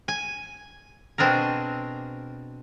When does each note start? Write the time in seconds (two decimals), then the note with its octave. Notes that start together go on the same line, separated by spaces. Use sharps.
0.08 G#5
1.18 B2 C4 D4 G#4 A#4